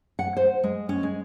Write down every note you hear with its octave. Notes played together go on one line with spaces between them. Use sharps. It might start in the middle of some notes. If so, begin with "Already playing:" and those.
F#5
C5
G#3
C#4
G#3